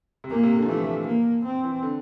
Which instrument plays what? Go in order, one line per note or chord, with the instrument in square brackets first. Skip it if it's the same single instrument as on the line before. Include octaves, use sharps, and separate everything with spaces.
[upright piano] C3
[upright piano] A#2 [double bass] A#3
[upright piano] C3
D3
F3
[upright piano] E3 [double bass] A3
[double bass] A#3
C4
[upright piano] E3
D3